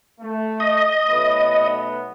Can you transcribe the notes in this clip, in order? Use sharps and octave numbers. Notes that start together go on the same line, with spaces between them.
A3
D#5
B1 A3 B3